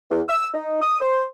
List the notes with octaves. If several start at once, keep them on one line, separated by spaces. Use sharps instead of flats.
E2
E6
D#4
D#6
C5